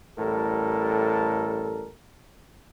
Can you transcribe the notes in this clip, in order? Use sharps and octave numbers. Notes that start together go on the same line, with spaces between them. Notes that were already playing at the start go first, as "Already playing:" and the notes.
A1 A2 G3 A4 A#4